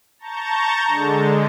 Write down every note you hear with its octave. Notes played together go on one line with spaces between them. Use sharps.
A5 A#5 C#6 G6 A6
D3 G#3